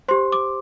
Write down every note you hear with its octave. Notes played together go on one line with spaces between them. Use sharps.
G4 C5 C6
D6